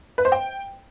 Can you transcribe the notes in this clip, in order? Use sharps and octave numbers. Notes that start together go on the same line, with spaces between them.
B4
C5
G5